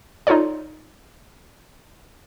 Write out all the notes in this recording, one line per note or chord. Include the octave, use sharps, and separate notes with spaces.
D#4 F4 A4 C#5 D5